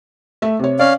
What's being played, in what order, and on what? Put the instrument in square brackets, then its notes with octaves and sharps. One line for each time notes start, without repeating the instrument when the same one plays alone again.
[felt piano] A3 E5
C3 C#5
[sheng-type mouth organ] C#4 F5 [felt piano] D5